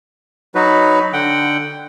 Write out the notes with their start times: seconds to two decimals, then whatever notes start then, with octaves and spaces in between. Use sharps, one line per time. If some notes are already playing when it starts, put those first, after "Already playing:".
0.55 F#3 D#4 F#4 B4
1.13 D3 F#5 G5